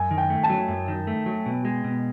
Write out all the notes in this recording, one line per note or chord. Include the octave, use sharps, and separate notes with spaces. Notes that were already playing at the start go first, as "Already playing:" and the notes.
Already playing: F#2 G#5
D#3
G5
A3
A5
F#3
F#2
D#3
A3
F#3
B2
G#3
B2